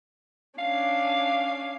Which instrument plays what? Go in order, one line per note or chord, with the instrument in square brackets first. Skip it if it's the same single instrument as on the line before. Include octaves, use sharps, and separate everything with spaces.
[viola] C#4 D4 [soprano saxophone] F5